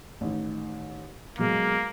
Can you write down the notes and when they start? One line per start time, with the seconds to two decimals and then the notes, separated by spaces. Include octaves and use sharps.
0.21 A1 D#3
1.39 B2 F#3 G#3 A#3